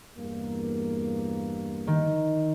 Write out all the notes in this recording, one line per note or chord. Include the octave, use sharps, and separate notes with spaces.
E2 G2 A#3
D#3